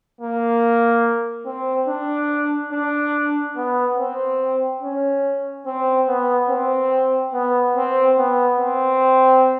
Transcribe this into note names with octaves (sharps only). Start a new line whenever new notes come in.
A#3
C4
D4
D4
B3
C4
C#4
C4
B3
C4
B3
C4
B3
C4